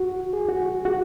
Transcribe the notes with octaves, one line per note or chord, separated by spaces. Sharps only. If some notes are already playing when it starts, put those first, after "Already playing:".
Already playing: F#4
G#4
F#4
F#4